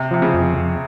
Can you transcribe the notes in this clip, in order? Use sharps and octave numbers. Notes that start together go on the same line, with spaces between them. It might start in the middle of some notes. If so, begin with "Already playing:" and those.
Already playing: C3
C3 F3
C#3
F2
F2